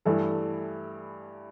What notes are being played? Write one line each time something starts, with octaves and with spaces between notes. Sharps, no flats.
G2 E3 A3 E4 A4